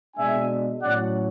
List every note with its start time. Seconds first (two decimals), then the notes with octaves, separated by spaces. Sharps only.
0.17 B2 G#3 D4 E5 G#5
0.82 A2 F#3 C#4 D5 F#5